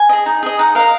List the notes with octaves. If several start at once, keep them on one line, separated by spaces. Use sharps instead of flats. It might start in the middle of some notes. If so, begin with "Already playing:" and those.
Already playing: G#5
G#4 D#5
D#4
G#4 D#5
D#4 F#5
A#4 D#5 F5